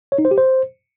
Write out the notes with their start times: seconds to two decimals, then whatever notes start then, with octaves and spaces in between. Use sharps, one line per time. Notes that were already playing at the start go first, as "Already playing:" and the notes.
0.12 C#5
0.18 D#4
0.25 C5
0.31 G4
0.38 C5